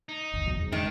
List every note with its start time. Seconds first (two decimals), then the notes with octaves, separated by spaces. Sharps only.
0.09 D#4
0.34 G1 D#2
0.46 B1 E2 F#3
0.58 F1 G#2
0.72 D#3 D4